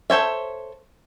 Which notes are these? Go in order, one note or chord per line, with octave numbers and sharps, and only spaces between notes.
A4 C5 C#5 E5